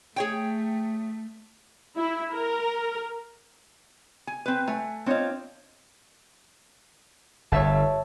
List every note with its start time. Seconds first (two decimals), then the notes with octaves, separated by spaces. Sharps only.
0.16 A3 G#4 C#5 G5
1.97 E4
2.33 A#4
4.27 G#5
4.46 C4 B4
4.67 A3 G#5
5.06 C4 D4 F4 C#5 D#5
7.52 G1 C#5 E5 A5